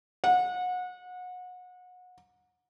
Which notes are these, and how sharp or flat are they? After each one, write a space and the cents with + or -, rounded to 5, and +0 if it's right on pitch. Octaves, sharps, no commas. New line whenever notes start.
F#5 -30